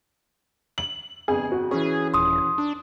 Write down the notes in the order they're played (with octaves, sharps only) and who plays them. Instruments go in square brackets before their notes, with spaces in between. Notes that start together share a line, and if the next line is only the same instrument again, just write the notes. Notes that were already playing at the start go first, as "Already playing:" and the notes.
[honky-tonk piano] F#7
[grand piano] G1 F2 [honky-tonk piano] G#4
[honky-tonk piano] F#4
[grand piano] E3 C#4 [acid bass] G#4
[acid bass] D#1 [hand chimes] C6 D#6
[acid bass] D4